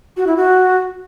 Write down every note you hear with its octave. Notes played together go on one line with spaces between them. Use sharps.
F#4
E4
F#4